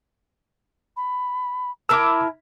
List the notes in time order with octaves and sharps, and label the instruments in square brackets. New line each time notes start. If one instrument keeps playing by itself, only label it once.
[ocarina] B5
[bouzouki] E4 A#4 A#5 [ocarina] A5 [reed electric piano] D6 E6